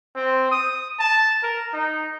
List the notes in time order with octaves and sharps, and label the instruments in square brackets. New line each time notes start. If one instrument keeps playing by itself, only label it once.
[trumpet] C4
D#6
A5
A#4
D#4